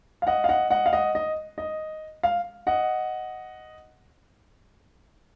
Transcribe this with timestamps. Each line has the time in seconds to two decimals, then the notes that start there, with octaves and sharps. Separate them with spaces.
0.22 F5
0.27 D#5 F#5
0.44 F5
0.49 D#5 F#5
0.71 D#5 F#5
0.86 F5
0.93 D#5 F#5
1.15 D#5
1.58 D#5
2.23 F5
2.67 D#5 F#5